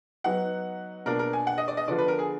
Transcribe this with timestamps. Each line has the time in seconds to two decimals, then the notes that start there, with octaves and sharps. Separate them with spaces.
0.24 F#3 B3 D#4 F#5
1.06 B2 A#3 D4 F4 A#4
1.19 A#4
1.33 G#5
1.47 F#5
1.58 D#5
1.68 D5
1.77 D#5
1.88 D3 F3 B3 D4 F4 D5
1.98 B4
2.08 A#4
2.19 G#4